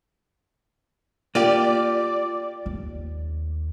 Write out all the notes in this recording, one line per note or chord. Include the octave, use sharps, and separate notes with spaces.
A#3 F4 G4 D5
D#2